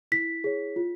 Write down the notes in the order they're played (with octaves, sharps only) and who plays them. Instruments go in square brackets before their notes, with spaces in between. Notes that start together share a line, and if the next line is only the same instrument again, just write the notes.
[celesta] E4 B6
G#4 C#5
F4